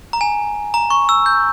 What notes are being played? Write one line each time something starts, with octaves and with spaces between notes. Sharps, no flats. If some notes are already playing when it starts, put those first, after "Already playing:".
A#5
G#5
A#5
C#6
E6
G6